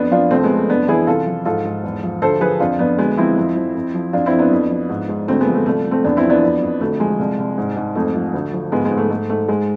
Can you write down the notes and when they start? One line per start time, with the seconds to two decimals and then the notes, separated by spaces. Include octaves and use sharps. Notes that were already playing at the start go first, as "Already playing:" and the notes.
Already playing: F2 B3 D4
0.11 F3 D4 F4
0.30 C2 A3 C4
0.43 G#3 B3
0.50 C2
0.56 A3
0.69 F2 B3 D4
0.88 E3 E4 G#4
1.07 C2 F4 A4
1.26 F3
1.45 G#2 F4 A4
1.65 G#2
1.84 E2
2.03 F3
2.22 D2 A4 C5
2.41 F3 G#4 B4
2.60 F2 D4 F4
2.79 F2 B3 D4
2.98 D2 G#3 B3
3.17 F3 C4 E4
3.37 F2
3.56 F3
3.75 F2
3.94 F3
4.13 F2 D4 F4
4.26 C4 E4
4.32 F2
4.39 B3 D4
4.51 F2
4.70 F3
4.89 G#2
5.09 G#2
5.28 D2 A3 C4
5.40 G#3 B3
5.47 F3
5.54 A3
5.66 C2 A3
5.85 F3
5.91 A3 C4
6.04 E2 B3 D4
6.17 C4 E4
6.23 F3
6.30 B3 D4
6.43 F2
6.62 F2
6.81 D2 A3
7.00 F3 G#3
7.19 C2
7.38 C2
7.58 G#2
7.76 G#2
7.95 F2 A3
8.15 F3
8.34 D2
8.53 F3
8.72 G#2 G#3 B3
8.85 G#3
8.91 G#2
8.97 A3
9.10 G#2 A3
9.30 G#2 A3
9.48 G#2 G#3